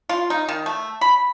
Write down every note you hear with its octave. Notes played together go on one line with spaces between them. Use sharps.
F4
D#4
D#3
A3
B5